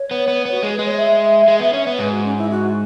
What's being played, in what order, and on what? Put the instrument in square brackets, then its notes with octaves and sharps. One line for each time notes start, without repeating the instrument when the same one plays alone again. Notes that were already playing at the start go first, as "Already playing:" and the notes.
Already playing: [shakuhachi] C#5
[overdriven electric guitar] B3
B3
B3
[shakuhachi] F#4
[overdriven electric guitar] G#3 [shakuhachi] G#4
[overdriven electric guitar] G#3 [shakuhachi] B4
[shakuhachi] C#5
E5
[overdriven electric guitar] G#3
B3
C#4
B3
[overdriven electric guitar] G#2 [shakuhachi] B4
[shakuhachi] F#4
C#4
E4
F#4